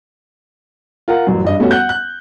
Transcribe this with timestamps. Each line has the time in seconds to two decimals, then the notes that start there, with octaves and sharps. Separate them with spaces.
1.08 F4 A#4 F#5
1.27 A1 F#2
1.45 G2 D#5
1.59 G3 A3 B3 C#4 F#4
1.71 F#5 F#6 G6
1.89 F#6